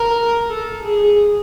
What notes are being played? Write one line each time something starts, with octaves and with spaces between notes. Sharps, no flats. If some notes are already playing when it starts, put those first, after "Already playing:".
Already playing: A#4
A4
G#4